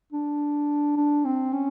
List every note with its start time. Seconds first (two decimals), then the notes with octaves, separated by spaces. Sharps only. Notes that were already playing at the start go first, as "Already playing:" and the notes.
0.13 D4
0.97 D4
1.25 C4
1.53 C#4